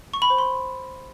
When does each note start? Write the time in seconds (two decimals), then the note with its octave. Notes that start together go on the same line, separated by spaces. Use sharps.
0.14 C#6
0.22 B5
0.30 C5
0.38 C6